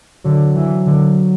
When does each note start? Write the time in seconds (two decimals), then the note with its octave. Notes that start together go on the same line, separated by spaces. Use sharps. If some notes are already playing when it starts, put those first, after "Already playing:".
0.24 D3 F#3
0.55 E3
0.86 D3